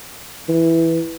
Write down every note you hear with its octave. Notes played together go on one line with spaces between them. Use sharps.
E3